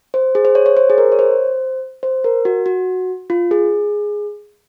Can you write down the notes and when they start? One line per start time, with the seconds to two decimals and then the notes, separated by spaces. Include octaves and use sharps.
0.14 C5
0.35 G#4
0.45 C5
0.55 C#5
0.66 C#5
0.77 C5
0.90 G#4
0.98 A#4
1.12 C#5
1.19 C5
2.03 C5
2.24 A#4
2.45 F#4
2.66 F#4
3.30 F4
3.51 G#4